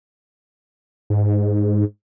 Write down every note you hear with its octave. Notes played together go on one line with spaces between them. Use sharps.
G#2